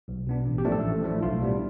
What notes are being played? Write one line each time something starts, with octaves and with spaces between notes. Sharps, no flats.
B1
B2 B3 D4
A1
G4
A2 F3 A3 D4
A4
A1
A2 F3 A3 D4
B1 F4
A2 G3 B3 D4